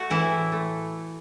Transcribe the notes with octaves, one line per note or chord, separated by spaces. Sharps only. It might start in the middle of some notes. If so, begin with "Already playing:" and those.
Already playing: A3 F#4
A2 E3 E4
A2
A3